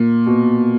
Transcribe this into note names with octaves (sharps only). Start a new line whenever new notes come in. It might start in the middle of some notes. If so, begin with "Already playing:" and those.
Already playing: A#2
B2